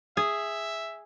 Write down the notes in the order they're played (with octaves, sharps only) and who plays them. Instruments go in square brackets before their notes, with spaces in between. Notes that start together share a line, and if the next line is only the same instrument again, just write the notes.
[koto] G#4 [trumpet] E5